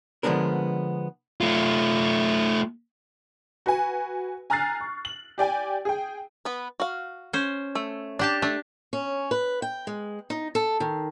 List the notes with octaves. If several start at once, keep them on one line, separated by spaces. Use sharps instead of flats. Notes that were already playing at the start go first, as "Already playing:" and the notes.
D3 F3 G#3 B3 D4 A#4
A3 F4
F#4 B4 G#5
G#5 A#5 F6 F#6 A6 C7
C#6
F#7
G4 D5 G5 G#5
G#4 G5
B3 B4
F#4 F5
C#4 C5
A3
D4 G4 D5 A5
A3 D4
C#4
B4
G5
G#3
D#4
A4
D#3